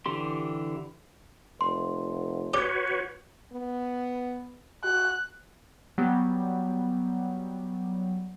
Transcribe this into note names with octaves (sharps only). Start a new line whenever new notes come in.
D3 E3 G4 C6
F1 C6
F#4 G4 B4 C#5 D5 G5
B3
F#4 F#6
F#3 G3 B3 G4